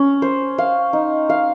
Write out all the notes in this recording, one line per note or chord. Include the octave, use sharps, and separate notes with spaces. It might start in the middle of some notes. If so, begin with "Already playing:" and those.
Already playing: C#4
C5
F5
D#4
F5